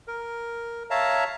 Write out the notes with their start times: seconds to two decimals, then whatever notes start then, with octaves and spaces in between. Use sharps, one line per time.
0.08 A#4
0.91 C#5 E5 F5 A5 A#5